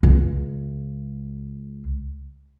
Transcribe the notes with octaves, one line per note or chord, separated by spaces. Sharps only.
C#2 G#3